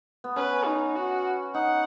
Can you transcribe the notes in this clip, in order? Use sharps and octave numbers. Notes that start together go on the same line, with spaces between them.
B3
C#4 B4
D#4
F#4
D#4 F#5